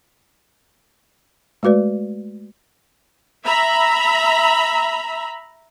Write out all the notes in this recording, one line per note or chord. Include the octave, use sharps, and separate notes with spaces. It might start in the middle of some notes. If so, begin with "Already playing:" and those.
G#3 A3 F#4 B4 D5
E5 A#5 B5